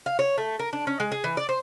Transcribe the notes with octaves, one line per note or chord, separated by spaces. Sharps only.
F5
C#5
A3
A#4
D4
C#4
G#3
G#4
E3
D5
C5